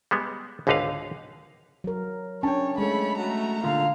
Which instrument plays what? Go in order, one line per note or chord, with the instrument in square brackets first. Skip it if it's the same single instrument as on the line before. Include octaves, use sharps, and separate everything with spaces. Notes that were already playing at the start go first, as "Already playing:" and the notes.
[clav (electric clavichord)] G3 G#3 B3
G#1 C#2 D3 D#4 B4 F5
[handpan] F#3 A#4
[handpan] C#4 D4 [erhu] C#5 [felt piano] G5 A5
[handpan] G#3 A4 [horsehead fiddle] A3 C#5 [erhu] B5
[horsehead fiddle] A3 F#4 [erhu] A#5
[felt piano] A#2 D3 [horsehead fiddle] F5